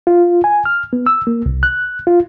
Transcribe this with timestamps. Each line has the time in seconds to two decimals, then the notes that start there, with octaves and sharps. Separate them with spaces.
0.07 F4
0.44 G#5
0.65 F6
0.93 B3
1.06 E6
1.27 A#3
1.46 C2
1.63 F#6
2.07 F4